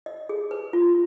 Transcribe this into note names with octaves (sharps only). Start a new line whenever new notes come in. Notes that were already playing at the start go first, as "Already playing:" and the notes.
D#5
G#4
B4
F4